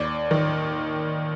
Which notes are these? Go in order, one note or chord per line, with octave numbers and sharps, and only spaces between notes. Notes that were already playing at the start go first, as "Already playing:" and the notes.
Already playing: D#2 D5
D#3